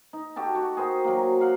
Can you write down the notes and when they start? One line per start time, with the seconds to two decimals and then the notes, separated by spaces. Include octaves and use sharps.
0.13 D#4
0.36 F#4 G4 A4 A5
0.55 F#4
0.77 G#4 A#4 C5 G5
1.04 F#3 A#3
1.41 F5 F#5